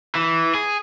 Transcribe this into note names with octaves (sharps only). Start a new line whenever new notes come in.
E3
G#4